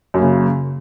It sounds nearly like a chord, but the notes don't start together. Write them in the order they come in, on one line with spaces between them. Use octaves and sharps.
F#2 A#3 C#3